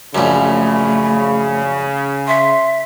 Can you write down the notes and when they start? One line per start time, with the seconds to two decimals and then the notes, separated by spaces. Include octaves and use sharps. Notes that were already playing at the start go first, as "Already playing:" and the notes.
0.15 A#1 F#2 C#3 A3 B5
2.28 E5 C6